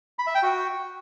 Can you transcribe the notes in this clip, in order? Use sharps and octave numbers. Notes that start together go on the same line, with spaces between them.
B5
E5
G5
F#4